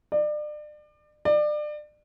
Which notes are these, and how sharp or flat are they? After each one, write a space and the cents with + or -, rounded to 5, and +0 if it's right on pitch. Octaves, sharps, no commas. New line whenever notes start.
D5 +35
D5 +30